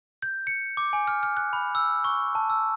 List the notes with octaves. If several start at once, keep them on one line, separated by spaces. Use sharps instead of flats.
G6
C#7
D6
G#5
F6
F6
F#6
B5
E6
C#6
A5
E6